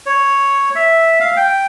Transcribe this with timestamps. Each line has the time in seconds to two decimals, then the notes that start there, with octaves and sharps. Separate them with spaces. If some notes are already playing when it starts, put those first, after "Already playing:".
0.06 C#5
0.75 E5
1.20 F5
1.37 G5